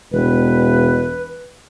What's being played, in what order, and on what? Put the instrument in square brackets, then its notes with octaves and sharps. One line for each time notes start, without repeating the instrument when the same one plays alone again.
[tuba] E1 [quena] B4